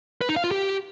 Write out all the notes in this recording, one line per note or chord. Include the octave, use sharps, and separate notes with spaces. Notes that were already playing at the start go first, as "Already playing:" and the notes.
B4
D#4
F5
F4
G4